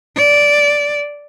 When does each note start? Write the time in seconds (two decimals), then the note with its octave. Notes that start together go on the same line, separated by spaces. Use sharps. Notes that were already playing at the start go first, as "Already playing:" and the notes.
0.17 D5